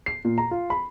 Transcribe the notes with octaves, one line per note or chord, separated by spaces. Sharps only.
C7
A#2
A#5
F4
B5